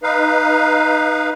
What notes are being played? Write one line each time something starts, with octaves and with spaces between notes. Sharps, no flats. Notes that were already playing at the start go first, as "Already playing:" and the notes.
D#4 B4 F5